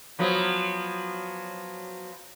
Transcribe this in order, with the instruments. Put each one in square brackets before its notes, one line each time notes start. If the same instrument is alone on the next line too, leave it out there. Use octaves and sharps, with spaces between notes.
[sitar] F3 F#3 B3